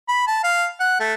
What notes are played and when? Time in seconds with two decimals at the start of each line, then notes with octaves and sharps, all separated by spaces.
0.09 B5
0.27 A5
0.44 F5
0.80 F#5
1.00 A3